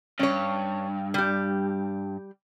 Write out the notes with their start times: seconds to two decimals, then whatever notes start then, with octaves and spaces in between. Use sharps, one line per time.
0.19 G2 C#4 C#5
1.14 G3 G4